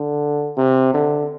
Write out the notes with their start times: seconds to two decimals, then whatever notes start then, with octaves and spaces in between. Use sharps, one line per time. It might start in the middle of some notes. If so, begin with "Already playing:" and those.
Already playing: D3
0.57 C3
0.94 D3